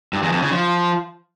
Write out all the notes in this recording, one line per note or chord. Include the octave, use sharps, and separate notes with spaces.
G2
E2
F2
C#3
F3